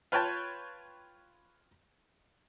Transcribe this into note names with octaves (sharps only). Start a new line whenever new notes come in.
F4 B4 C#5 G5 A5